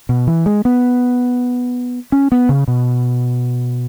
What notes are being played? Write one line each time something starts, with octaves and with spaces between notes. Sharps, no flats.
B2
E3
G#3
B3
C#4
B3
C#3
B2